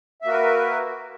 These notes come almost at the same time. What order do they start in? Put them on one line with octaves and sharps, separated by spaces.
E5 A#3 F#4 A#4 B4